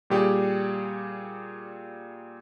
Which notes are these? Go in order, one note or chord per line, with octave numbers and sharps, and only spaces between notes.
A#2 G3 G4 G#4 D5